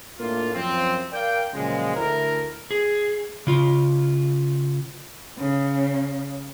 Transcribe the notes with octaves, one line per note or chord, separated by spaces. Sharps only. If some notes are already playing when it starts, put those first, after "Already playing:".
A2 A#3 D4 F4
F#2 F3 C4
A#4 D5 F5 G5
A#2 C#3 F3 F#3 G#3
D2 E4 A#4
G#4
C#3 F4
C#3